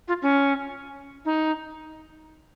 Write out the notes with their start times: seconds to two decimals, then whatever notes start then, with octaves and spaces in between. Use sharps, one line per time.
0.08 F4
0.22 C#4
1.25 D#4